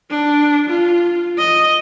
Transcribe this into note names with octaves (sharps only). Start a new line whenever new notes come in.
D4
F4
D#5